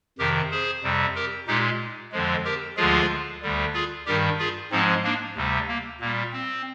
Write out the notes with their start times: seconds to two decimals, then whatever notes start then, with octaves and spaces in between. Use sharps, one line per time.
0.19 F2 C3 D#3 G4 A#4
0.51 G#4 C5
0.83 F2 C3 G3
1.15 G4 A#4
1.47 A#2 G#3 D#4 G4
2.12 F2 D3 F3 G#3
2.44 G4 A#4
2.77 D2 D3 F3 G#3 F4 G#4
3.42 D2 D3 G3
3.74 F4 G#4
4.06 G2 D#3 G3 G4 A#4
4.38 F4 G#4
4.71 G#2 F3 G#3 C4 D#4
5.04 A#3 D4
5.35 D2 C3 G3
5.68 A#3
6.00 A#2 G3 A#3
6.32 C4